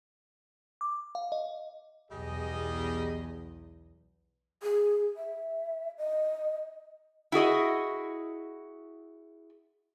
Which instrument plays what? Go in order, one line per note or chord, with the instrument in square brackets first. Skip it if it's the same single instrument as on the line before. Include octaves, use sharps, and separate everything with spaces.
[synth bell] D6
F5
D#5
[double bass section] B1 E2 [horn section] G3 G#4 D#5
[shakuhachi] G#4
E5
D#5
[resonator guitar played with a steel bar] E4 F#4 G#4 D#5